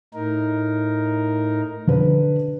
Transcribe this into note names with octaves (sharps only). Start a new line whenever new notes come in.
A2 D#4 A#4
D3 B4